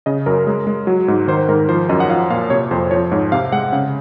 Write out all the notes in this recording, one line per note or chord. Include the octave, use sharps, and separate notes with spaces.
C#3 D#5
F#2 A#4
G#3
G#3
F#3
G#2
D#3 C5
C5
G#2 A#4
A#4
F3 C5
F#2 D#5
F#5
F3 F5
A#2 F5
C3 C#5
F2 C5
F3 C#5
G#2 C#5
C3 F5
G#3 F#5
C#3 F5